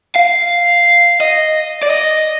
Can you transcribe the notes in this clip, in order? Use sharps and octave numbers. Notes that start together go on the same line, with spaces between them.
F5
D#5
D5
D#5